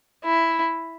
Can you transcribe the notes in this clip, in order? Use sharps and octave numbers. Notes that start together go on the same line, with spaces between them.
E4